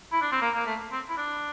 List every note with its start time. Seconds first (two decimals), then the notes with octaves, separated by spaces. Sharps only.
0.12 E4
0.22 D4
0.32 C4
0.42 A#3
0.55 A#3
0.66 A3
0.92 C4
1.09 E4
1.17 D4